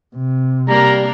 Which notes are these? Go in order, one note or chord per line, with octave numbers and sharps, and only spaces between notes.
C3
G3 A#3 D4 A#4 A#5